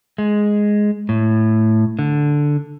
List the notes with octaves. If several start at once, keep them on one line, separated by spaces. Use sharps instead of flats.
G#3
A2
D3